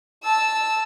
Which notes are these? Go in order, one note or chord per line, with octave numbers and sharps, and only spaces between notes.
A5 E6